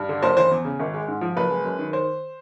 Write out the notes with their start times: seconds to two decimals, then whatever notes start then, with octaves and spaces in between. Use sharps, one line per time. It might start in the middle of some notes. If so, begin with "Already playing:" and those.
Already playing: G2
0.09 D3
0.23 F#1 C5
0.37 E3 C5
0.51 E2
0.65 C#3
0.80 G#1
0.94 G#3
1.08 G#2
1.21 F3
1.37 F#1 B4
1.50 G#3
1.65 F#2
1.79 D#3
1.93 C5